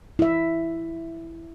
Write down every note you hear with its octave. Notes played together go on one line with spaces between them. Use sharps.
E4 E5